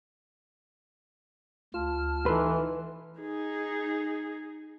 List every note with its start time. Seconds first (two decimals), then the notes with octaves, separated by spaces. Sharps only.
1.74 D2 F4 A5 F6
2.26 E3 D#4 A4 B4 C6
3.20 D#4 G#4